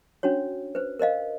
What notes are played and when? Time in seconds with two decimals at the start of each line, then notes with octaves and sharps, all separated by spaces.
0.23 C#4 D4 F#4 C#5
0.75 B4 C5
0.99 A#4 C5 D#5 F5